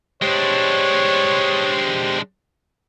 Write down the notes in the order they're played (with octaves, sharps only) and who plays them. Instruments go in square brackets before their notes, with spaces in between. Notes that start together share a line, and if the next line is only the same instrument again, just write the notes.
[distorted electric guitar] G#3 D4 [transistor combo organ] G4 C5 [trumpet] C#5